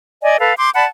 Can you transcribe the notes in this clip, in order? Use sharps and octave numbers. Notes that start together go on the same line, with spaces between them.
D5 D#5 G#5
A4 B4 F5
C6 D6 G6
D5 F#5 A5 B5